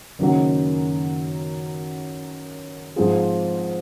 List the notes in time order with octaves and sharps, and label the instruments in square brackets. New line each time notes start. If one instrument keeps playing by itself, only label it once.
[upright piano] F#1 F#2 D#3 F#3
G#2 F3 C4 F4 G#4